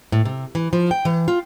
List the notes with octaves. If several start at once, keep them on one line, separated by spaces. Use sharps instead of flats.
A2
C3
E3
F3
G5
E3
F4